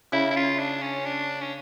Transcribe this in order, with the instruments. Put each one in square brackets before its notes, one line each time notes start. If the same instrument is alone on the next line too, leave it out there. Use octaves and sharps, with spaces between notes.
[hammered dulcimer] C#3 [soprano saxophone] E4
[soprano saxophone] E4
F4
D4
C#4
D4
C#4